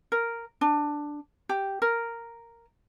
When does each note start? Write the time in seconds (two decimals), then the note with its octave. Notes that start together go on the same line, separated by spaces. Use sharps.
0.12 A#4
0.61 D4
1.49 G4
1.82 A#4